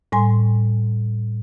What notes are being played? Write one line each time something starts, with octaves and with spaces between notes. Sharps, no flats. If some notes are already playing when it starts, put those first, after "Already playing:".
A2 G3 G#5 C6